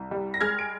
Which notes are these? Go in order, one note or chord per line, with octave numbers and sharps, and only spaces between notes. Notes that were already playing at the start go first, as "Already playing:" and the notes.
Already playing: C2
G3
A#6
G#3 F6 G#6
D7